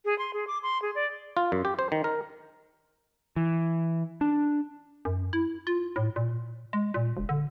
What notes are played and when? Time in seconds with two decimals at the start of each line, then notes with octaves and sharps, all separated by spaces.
0.05 G#4
0.19 C6
0.33 G#4
0.47 D6
0.63 C6
0.82 G#4
0.95 D5
1.37 F4
1.52 F#2
1.65 G4
1.79 C5
1.92 D#3
2.04 A#4
3.36 E3
4.21 D4
5.05 F#2
5.33 E4
5.67 F4
5.96 A2
6.16 A#2
6.73 G#3
6.94 A#2
7.17 E1
7.29 D3